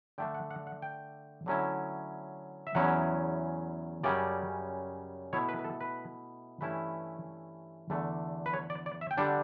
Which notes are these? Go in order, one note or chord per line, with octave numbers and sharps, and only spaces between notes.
D3 A3 D4 G5
F#5
F#5
F#5
G5
D3 F#3 A3 C#4 E4
E5
E2 C#3 F#3 C#4 E4 F#5
F#2 C#3 G3 C#4 D5
B2 A3 E4 C#5
B4
B4
A4
B4
G2 E3 A3 C#4 E4 B4
E2 D3 A3 D4
B4
C#5
D5
D5
E5
G5
D3 G3 D4 F#5